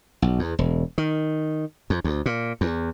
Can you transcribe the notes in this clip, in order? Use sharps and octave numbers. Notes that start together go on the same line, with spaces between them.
B1
E2
E1
D#3
F2
D2
A#2
E2